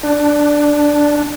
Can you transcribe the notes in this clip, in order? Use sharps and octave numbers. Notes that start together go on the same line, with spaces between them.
D4